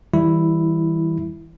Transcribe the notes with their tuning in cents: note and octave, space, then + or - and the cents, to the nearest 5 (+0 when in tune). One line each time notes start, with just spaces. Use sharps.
E3 -30 G3 +0 E4 +0